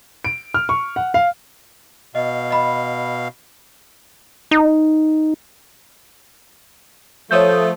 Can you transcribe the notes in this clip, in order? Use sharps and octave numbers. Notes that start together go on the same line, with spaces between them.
D7
F6
C#6
F#5
F5
B2 D#5 F5
D#5 B5
D#4
F3 A3 C#5 D#6 G6